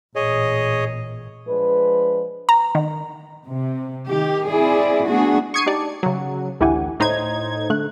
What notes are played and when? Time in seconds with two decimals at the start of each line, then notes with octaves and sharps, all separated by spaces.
0.16 A1 A#2 G#4 C#5 D#5
1.47 F3 G#3 D4 B4
2.49 A#5
2.75 D#3
3.47 C3
4.08 D#3 G4
4.49 C4 E4 G#4 D5
5.08 A3 B3 D4 F#4 G#4
5.54 C#6 D#6 G#6 C7 C#7 D#7
5.66 D#4 G4 D5 A5
6.03 C#3 F#3
6.60 A1 D2 E4 G4 F#5 G#5
7.00 A2 D#4 C5 G#6
7.70 D3 A3 F#6